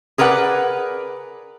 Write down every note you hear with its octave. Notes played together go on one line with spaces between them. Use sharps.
G#4 A#4 B4 D5 F#5